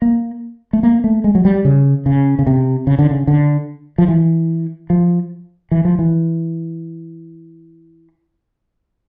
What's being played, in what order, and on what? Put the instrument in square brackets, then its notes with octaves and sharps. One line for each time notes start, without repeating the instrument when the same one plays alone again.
[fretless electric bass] A#3
A3
A#3
A3
G#3
F#3
G3
C#3
C#3
C#3
C3
C#3
D3
C#3
D3
F3
E3
F3
E3
F3
E3